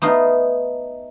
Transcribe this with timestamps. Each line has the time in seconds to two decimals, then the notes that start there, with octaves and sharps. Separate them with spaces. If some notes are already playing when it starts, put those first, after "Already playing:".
0.02 A3 B3 D#4 F5